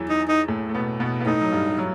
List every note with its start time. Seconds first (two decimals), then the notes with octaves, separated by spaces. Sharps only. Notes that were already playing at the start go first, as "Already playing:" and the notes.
Already playing: E2 E3 F#3
0.09 D#4
0.29 D#4
0.48 A2 A3
0.69 A3
0.75 B2 B3
1.00 B2 B3
1.21 B3
1.26 A2 A3 D#4
1.41 F#3
1.52 G2 G3
1.68 G3
1.78 F#3